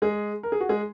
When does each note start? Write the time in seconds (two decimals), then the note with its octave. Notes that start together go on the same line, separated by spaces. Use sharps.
0.02 G#3 G#4
0.43 A#4
0.52 G#4
0.60 F#4
0.69 G#3 G#4